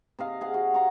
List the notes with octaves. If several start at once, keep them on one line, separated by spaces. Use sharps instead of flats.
C3 D#5 F5
G#4 F5 F#5
F#4
F5 A#5 C#6